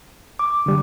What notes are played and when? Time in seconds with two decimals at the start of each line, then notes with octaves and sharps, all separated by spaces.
0.39 D6
0.66 D3 G3